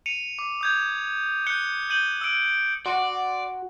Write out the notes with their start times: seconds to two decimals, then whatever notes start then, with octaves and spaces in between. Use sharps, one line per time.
0.06 C#7 D#7 F7
0.39 D6
0.61 D#6 G6 G#6
1.47 F#6 G6 C#7 G7
1.90 G6 D#7 F#7 G7
2.21 E6 D7
2.86 F#4 D5 F#5 C6